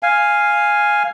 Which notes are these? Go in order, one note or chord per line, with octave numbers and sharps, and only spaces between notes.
F5 G#5